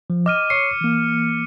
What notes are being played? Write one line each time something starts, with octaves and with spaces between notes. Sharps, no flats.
F3
D#5 D6 F6 D#7
C#5 C#6 C7 C#7
E3 A#3